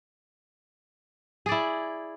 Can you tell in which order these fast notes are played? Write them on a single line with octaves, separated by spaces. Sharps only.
G#4 D5 E4